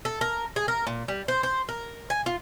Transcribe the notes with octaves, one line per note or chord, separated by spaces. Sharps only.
A4
A#4
G#4
A#4
A#2
G3
C5
C5
A#4
G#5
F4